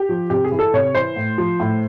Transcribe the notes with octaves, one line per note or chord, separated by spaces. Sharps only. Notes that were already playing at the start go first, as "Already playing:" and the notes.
Already playing: G4
F3
C3 G4
G#4
E3
A4
C3 C#5
E3 C5
A2
F3
A2